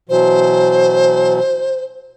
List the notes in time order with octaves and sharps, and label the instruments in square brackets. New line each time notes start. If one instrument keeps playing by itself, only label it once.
[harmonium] B2 E3 F#3 [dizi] C5